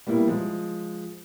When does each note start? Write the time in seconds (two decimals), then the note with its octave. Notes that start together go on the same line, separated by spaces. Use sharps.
0.07 G3 A#3 B3 E4
0.27 F3 G#3